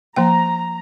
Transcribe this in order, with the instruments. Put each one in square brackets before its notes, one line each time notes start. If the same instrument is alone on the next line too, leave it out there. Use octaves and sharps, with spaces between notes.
[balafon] F3 A#3 G5 [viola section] A#5